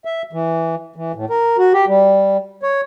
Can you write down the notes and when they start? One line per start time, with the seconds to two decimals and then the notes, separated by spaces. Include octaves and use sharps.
0.05 E5
0.33 E3
0.96 E3
1.15 A2
1.30 A#4
1.58 F#4
1.74 G4
1.88 G3
2.63 C#5